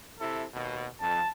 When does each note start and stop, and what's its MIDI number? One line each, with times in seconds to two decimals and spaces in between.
0.19 0.44 48
0.19 0.44 64
0.19 0.44 69
0.53 0.87 39
0.53 0.87 47
1.01 1.20 41
1.01 1.29 81